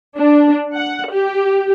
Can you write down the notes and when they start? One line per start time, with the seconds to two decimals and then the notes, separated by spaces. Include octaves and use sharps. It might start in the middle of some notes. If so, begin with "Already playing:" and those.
0.17 D4
0.74 F#5
1.10 G4